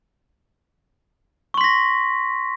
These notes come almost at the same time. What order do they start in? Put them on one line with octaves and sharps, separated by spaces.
C#6 C6 B6 A#6